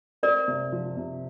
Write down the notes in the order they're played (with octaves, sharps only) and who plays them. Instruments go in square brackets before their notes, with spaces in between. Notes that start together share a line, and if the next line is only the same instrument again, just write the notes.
[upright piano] C4 [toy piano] A#4 D5
[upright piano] C3
F3
C3